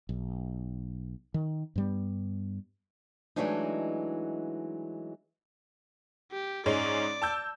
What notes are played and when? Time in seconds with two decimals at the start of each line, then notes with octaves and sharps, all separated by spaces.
0.09 B1
1.34 D#3
1.76 G2 G3 B3
3.36 E3 F#3 G#3 A3 D4 D#4
6.32 G4
6.66 G#2 G#3 C#4 D5
7.22 A5 E6 G6